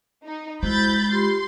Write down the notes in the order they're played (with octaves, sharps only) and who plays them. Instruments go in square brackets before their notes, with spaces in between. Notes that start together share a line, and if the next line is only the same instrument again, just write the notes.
[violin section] D#4
[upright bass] G#3 [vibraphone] E4 F#4 C5 [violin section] B5 G6 A6
[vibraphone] F4 G4 B5 [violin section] C6